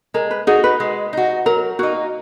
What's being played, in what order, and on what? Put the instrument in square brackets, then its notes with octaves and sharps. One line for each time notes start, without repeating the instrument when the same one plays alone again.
[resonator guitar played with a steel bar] G#3 [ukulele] A#4
[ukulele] B4
[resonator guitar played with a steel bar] D#4 F#4 [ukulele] G#4
[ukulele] B4
[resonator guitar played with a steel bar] G#3
D#4 F#4
[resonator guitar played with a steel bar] F#3 [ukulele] A#4
[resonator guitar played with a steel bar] A#3 D#4 [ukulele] F#4